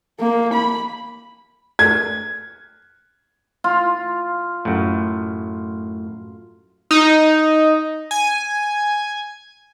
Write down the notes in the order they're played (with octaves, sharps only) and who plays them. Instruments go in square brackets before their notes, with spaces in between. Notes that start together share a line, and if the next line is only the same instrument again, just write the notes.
[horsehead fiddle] A#3
B5
[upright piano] G#6
[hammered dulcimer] F4
[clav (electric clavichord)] F#2 A2
[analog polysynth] D#4
G#5